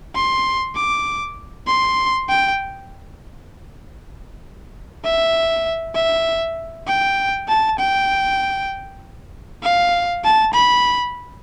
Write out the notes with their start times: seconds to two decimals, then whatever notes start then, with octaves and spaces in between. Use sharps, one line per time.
0.15 C6
0.75 D6
1.67 C6
2.29 G5
5.04 E5
5.95 E5
6.87 G5
7.48 A5
7.79 G5
9.63 F5
10.24 A5
10.54 B5